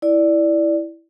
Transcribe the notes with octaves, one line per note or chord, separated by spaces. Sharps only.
E4 D5